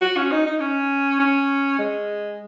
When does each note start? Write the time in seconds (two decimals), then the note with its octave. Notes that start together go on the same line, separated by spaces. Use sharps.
0.01 F#4
0.17 C#4
0.32 D#4
0.46 D#4
0.60 C#4
1.20 C#4
1.78 G#3